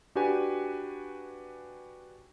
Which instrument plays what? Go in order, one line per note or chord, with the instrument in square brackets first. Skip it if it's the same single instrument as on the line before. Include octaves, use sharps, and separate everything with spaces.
[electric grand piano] D4 F#4 G4 B4 G#5